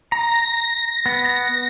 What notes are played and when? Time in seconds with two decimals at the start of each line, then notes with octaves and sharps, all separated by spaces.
0.12 A#5 A#6
1.06 B3